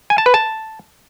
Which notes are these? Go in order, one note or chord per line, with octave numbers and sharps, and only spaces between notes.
G#5
A5
B4
A5